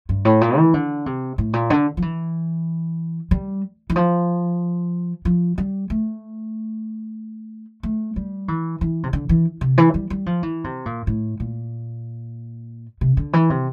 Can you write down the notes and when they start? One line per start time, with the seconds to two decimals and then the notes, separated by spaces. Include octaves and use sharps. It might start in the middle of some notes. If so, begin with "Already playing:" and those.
0.09 G2
0.25 A2
0.41 A#2
0.57 E3
0.74 D3
1.06 C3
1.38 A2
1.53 A#2
1.70 D3
1.97 F3
2.02 E3
3.31 G3
3.90 E3
3.96 F3
5.25 F3
5.58 G3
5.90 A3
7.83 A3
8.16 G3
8.48 E3
8.81 E3
9.03 C3
9.13 D3
9.29 E3
9.61 C3
9.78 E3
9.94 G3
10.10 G3
10.26 F3
10.43 E3
10.64 C3
10.86 A#2
11.07 A2
11.40 A#2
13.01 C3
13.17 D3
13.33 E3
13.50 C3